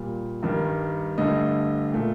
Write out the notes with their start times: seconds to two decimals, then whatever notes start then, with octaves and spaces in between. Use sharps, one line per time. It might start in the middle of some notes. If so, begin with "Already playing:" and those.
Already playing: A#2 G3
0.43 G2 D#3 G3
1.18 G2 D3 A3 D#5
1.92 A#2 A3